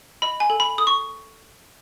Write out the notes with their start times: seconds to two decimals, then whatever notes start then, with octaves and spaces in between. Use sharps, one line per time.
0.22 D#5 B5
0.40 G#5
0.50 A4
0.60 B5
0.78 A4 D#6
0.87 C#6